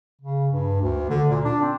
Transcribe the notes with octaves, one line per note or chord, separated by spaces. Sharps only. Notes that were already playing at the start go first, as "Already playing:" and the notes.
C#3
G2
D2
D3
A#2
D4
C4